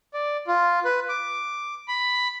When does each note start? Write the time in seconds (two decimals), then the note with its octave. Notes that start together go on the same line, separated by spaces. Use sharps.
0.14 D5
0.48 F4
0.85 B4
1.09 D6
1.88 B5